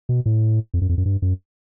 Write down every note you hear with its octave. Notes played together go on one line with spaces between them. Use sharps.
B2
A2
F2
F#2
F2
F#2
G2
F#2